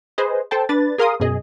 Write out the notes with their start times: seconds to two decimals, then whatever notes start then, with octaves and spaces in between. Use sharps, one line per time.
0.18 G#4 B4 C5 D#5
0.51 A4 C5 G5 A5
0.69 D4 B4 A6
0.98 G#4 A#4 F5 C6 D#6
1.20 F#2 B2 G#4 D#5